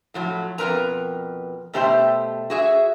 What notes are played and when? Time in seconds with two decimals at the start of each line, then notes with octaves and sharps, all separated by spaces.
0.14 A2 F3 F#3
0.58 F2 B2 G3 A#4 B4 A#5
1.73 B2 A3 G4 C5 E5
2.50 F#4 G#4 E5